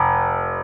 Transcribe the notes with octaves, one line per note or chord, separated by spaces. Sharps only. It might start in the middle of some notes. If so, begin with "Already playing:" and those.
Already playing: F1